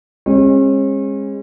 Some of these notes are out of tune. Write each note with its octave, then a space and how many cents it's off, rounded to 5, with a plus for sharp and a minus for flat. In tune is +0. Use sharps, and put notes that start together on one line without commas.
G#3 -25 C#4 -40